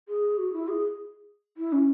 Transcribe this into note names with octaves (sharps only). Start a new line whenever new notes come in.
G#4
F#4
E4
G#4
E4
C#4